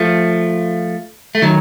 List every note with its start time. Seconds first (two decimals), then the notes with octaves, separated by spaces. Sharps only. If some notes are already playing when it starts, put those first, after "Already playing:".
Already playing: F3 A3
1.35 A3
1.42 D#3 F#3